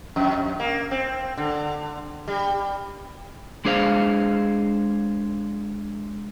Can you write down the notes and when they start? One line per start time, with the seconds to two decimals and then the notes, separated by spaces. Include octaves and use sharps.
0.16 F2
0.60 A#3
0.91 C4
1.37 D3
2.28 G3
3.65 G#3 D4 G#4 C5 F5